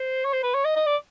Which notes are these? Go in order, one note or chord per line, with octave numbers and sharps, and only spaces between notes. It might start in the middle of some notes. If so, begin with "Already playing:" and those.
Already playing: C5
C#5
C5
B4
C#5
D#5
D#5
D5